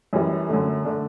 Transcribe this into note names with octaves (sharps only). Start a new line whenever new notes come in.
F#2 E3 G3
F#2 D3 A3
D3 A3 D4